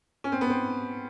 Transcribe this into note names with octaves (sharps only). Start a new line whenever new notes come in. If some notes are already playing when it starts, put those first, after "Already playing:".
C#4
C4
B3
C4